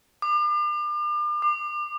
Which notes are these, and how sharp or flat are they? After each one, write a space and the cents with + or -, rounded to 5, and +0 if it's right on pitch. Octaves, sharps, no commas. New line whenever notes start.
D6 +40
D6 +30